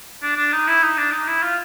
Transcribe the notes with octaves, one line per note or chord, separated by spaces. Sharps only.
D4
D4
D#4
E4
D#4
D4
D#4
E4
F4